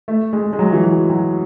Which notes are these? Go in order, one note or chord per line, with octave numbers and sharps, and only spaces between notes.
A3
G#3
G#3
F#3
E3
F#3
F#3